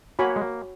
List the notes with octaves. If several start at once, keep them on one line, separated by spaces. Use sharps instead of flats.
A#3 F#4 C#5 G#5 B5
G#3
A#3